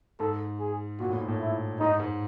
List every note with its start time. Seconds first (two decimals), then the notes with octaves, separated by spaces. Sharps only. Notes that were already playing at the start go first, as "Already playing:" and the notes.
0.20 G#2 A4
0.60 G#4
1.00 A#2 F#4
1.09 A2
1.18 G#2
1.28 A2
1.40 E4
1.80 G#2 D#4
2.00 G#2